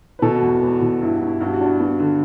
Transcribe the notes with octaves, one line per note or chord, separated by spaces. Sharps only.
B4
B2 F#4 A4
F#4
E2
F#4
E2
B2
G2 E4
F#4
G2
E4
G2 F#4
F#4
D4
F#4
B3 F#4
D3